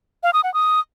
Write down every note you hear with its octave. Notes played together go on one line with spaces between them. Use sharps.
F5
D#6
F#5
D#6